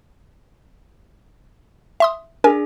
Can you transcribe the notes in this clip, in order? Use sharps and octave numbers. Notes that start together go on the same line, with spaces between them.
E5 C6 D#6
D4 G#4 A#4 G#5